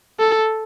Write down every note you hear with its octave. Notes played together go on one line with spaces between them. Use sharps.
A4